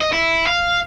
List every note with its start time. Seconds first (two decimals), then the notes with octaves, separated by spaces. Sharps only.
0.01 D#5
0.13 E4
0.47 F5